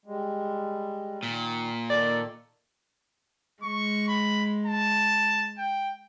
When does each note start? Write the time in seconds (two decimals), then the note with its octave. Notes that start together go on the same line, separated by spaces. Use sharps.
0.06 G3 G#3
1.23 A#2 D#3
1.90 D#3 A4 D5
3.63 G#3 C#6
4.08 B5
4.66 A5
5.58 G5